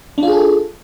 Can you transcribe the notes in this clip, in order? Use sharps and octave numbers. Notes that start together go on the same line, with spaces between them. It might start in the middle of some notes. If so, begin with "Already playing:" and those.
D4 F4 G#4 A4